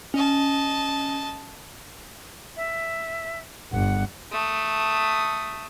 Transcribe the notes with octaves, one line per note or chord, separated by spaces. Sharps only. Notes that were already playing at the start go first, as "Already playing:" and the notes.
C#4 D#5 A5
E5
G1 F#5
A3 D#6